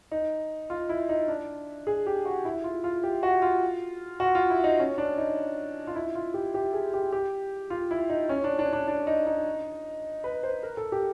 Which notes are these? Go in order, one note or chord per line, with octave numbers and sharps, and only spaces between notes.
D#4
F4
E4
D#4
D4
G#4
G4
F#4
E4
F4
F4
G4
F#4
F4
F#4
F4
E4
D#4
C#4
D4
D#4
F4
E4
F4
G4
G4
G#4
G4
G4
F4
E4
D#4
C#4
D4
D4
D4
D4
D#4
D#4
B4
C5
A#4
A4
G4